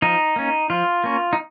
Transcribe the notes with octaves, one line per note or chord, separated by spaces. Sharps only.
F3 D#4
A#3 C#4
F3 F4
A#3 C#4
D#4